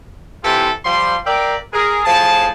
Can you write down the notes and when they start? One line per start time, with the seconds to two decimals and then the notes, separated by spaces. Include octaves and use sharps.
0.44 C3 E3 E4 F4 G4 A4
0.85 F3 G3 C6
1.26 A#4 D5 E5 F5 G5
1.73 G#4 A#4
2.05 A2 F3 G#4 A5